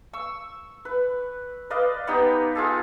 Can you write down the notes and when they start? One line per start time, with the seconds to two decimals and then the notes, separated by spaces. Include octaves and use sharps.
0.13 C#6 E6
0.85 B4
1.70 B4 D5 D#5 F5
2.07 B3 D#4 G4
2.55 F4 G#4 A4